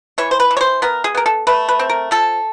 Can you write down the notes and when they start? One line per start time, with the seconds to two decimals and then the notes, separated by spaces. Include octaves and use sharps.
0.18 E3 C#5
0.31 C5
0.40 B4
0.51 E3
0.57 C#5
0.61 C5
0.82 B3 A#4
1.04 G#4
1.15 B3 A#4
1.26 A4
1.47 A3 B4
1.69 B4
1.79 C4
1.89 A#4
2.11 F3 A4